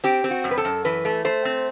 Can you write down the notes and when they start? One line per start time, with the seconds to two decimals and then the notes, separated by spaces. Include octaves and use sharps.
0.04 C4 G4
0.24 C4
0.31 F#4
0.44 F#2
0.51 B4
0.58 A4
0.65 F#2
0.85 E3 B4
1.05 A3
1.25 A3 C5
1.45 C4